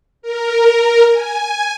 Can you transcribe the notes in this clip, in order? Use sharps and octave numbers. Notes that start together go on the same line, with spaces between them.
A#4
G#5